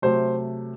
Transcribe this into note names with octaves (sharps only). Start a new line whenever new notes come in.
C3 F#3 A3 C5